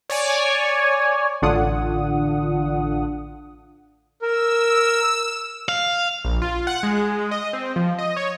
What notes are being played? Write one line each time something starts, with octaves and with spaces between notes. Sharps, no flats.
C#5 D5 G#5
A1 D3 D4 F4 F#5 D#6
A#4 E6
F5
A#1
F4
F#5
G#3
D#5
C4
F3
D#5
C#5